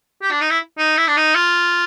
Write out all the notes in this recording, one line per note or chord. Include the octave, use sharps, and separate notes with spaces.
G4
D4
D#4
E4
D#4
E4
D4
D#4
F4